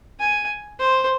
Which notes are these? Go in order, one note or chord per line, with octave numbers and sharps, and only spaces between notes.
G#5
C5